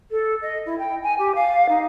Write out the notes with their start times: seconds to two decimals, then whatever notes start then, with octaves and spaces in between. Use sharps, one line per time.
0.11 A4
0.42 D#5
0.66 E4
0.79 G5
1.03 G#5
1.19 G4
1.35 F5
1.69 D#4